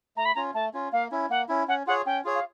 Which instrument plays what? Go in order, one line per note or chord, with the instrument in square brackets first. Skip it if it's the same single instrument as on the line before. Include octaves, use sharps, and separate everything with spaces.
[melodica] A3 [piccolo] A#5
[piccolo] B5
[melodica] C#4 F4 [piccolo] A#5
[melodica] A3 [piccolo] A5
[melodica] C#4 F4
[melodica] A#3 [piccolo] F5
[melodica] C#4 E4
[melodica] A#3 [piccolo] F#5
[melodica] C#4 E4
[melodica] C#4 [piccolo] F#5
[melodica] F4 G#4 C#5 [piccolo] F#5
[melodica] C#4 [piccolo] G5
[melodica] F4 G#4 C#5
[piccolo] F5